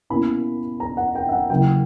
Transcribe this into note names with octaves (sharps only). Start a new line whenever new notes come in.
B2 A#3 C#4 E4 B5
A#5
F#5
G5
E5
F#5
C#3 F#3 A#3 E4 G5